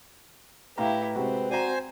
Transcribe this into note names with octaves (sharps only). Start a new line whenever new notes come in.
A2 E4 G4 B4 F5 A#5
C3 G#3 C4 F#4
F#4 C5 D5 G#5 A#5